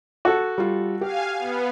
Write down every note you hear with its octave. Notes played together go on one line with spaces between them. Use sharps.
F#4 A4
G3 F4
G4 F5 G#5
B3